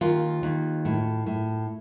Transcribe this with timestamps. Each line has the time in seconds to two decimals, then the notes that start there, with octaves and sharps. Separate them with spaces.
0.01 D#2 F4
0.43 D#2
0.85 A2
1.26 A2